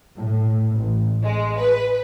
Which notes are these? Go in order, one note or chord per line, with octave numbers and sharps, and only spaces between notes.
A2
A1
G#3
B4